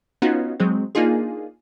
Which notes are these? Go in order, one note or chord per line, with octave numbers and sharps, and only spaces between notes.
B3 C#4 D#4 F4 F#4
F#3 G#3 C4
A#3 D4 D#4 F4 G#4